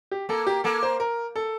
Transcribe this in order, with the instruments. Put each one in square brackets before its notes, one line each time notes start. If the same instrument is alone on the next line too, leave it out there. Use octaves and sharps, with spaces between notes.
[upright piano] G4
[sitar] A#3 [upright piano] A4
[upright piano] G4
[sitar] A#3 [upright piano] A4
[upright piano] C5
A#4
A4